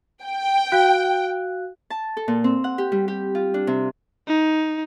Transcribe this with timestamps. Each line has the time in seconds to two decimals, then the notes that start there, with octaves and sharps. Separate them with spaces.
0.24 G5
0.72 F#4 F5 F#6
1.90 A5
2.17 A4
2.28 A#2
2.44 C4
2.64 F#5
2.78 G4
2.92 G3
3.08 G4
3.35 F4
3.54 D4
3.67 C3
4.27 D#4